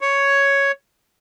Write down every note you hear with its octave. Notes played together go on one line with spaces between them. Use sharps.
C#5